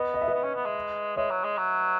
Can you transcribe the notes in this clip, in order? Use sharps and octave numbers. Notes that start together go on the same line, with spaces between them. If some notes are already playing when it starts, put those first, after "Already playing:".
Already playing: B3 B4 D#5
D#5
E5
B4 D#5
B3
C#4
B3
G#3
G#3 C#5 E5
F#3
G#3
F#3